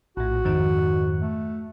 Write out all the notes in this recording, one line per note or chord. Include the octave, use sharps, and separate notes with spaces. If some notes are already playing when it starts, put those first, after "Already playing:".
A#1 A2 F#4
F2 G#2 D#3
A3